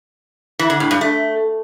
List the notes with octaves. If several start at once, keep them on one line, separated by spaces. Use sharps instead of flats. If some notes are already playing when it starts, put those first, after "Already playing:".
E3
D3
A2
G2
A3